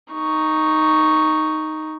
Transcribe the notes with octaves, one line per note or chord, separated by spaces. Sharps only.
D#4 C#6